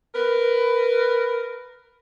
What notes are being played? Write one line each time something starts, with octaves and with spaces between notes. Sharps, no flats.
A#4 B4